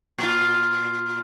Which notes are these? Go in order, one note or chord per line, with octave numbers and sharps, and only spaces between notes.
A#2 F4